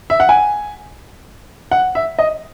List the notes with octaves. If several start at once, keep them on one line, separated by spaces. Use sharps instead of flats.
E5
F#5
G#5
F#5
E5
D#5